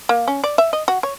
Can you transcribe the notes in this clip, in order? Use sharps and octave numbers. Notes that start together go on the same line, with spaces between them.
A#3
C#4
D5
E5
D#5
F#4
C#5